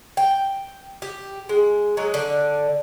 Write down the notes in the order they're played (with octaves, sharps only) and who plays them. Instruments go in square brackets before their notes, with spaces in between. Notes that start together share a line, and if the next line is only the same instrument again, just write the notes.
[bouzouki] G5
G4
G#3
F#3 G#3
D3 D5